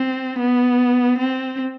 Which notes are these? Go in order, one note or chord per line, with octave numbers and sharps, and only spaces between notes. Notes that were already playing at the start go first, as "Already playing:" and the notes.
Already playing: C4
B3
C4